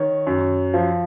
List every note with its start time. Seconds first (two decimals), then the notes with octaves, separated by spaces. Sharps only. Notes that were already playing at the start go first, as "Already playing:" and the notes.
Already playing: D#3 C#5
0.27 F#2
0.74 F3